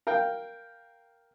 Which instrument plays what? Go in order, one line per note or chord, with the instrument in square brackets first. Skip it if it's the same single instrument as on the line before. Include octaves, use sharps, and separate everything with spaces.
[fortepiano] A#4 F5 G5